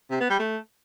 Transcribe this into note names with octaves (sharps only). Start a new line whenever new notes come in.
C3
B3
G3
A3